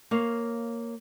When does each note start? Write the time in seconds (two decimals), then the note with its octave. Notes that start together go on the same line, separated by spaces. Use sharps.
0.11 A#3 C#5 F5